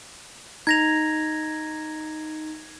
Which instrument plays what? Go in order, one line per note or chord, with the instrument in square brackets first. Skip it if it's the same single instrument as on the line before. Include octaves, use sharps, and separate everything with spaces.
[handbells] D#4 [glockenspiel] G#6 A#6 F7